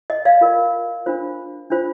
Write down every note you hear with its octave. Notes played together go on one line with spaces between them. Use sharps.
D#5
D5 F5
F4 A#4
D4 F4 C5
D4 F4 C5